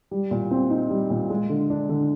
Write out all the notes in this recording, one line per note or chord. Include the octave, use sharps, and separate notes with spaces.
G3
A#2
C4
D#4
G3
A#2
G#3
D3
D4
D3